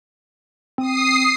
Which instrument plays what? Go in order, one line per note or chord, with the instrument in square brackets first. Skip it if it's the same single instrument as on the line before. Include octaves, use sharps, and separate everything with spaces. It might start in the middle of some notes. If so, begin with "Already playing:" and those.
[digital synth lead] C4 [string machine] D#6 C7